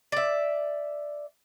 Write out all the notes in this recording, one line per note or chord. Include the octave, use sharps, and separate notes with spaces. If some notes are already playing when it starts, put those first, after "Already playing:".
D5 E5